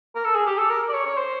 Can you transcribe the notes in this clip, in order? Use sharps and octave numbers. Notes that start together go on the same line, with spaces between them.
A#4
A4
G#4
G4
A4
A#4
D5
C#5
C#5
C5